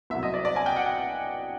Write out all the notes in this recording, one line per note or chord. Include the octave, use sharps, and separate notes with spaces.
C2 B2 F#3 E5
D#5
D5
D5
G#5
G5
F#5
G5